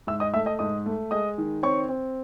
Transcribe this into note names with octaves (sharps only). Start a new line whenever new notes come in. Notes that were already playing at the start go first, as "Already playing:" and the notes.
G#2 E5 E6
D#5 D#6
A3 E5 E6
D#5 D#6
G#2 D#5 D#6
A3
G#3 D#5 D#6
D#3
C4 C#5 C#6
C4